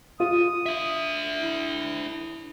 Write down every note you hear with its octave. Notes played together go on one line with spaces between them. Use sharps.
F4 D#6
D4 E5
E4